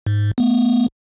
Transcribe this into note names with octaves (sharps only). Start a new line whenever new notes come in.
G#2
A3 B3